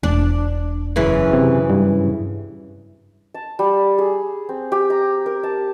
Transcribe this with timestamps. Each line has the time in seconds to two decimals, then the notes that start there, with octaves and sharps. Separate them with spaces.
0.03 E1 D4
0.96 F#2 C#3 E3
1.33 C3
1.70 G2
3.34 A5
3.59 G3
3.98 G#4
4.49 C4
4.72 G4
4.90 A#5
5.26 A#4
5.43 A5